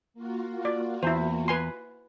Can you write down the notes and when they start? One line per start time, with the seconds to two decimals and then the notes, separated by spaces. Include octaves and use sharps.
0.14 A#3 F4 F#4
0.65 D5
1.03 E2 E4 C5
1.48 B4 G#5 C6